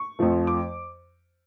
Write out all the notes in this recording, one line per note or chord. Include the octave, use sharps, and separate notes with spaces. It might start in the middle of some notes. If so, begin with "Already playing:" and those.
Already playing: C#6
F2 F3 A3
D6